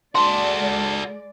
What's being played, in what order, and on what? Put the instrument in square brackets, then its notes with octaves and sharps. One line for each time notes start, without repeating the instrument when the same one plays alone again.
[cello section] G#3 D5 [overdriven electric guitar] F#4 A4 [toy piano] C6